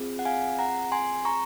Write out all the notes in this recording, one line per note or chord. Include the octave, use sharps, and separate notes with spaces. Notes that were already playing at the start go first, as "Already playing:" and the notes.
Already playing: C4 F4 G#4
F#5
F5 G#5
F#5 A#5
G#5 C6
A#5 C#6